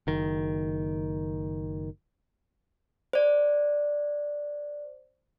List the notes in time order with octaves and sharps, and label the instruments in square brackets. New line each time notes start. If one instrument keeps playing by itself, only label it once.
[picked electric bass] F#1 D#3
[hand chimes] C5 D5